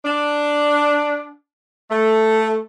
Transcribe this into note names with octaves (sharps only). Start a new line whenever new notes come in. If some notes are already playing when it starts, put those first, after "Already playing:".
D4
A3